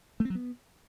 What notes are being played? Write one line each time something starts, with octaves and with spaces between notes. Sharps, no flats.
A3
C4
F#3
B3